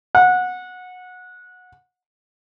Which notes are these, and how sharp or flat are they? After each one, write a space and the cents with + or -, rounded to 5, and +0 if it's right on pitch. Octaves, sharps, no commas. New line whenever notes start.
F#5 -20